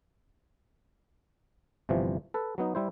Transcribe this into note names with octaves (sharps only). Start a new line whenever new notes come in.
G1 C3 E3 F3
A4 B4
F#3 B3 D#4
G3 E4 C5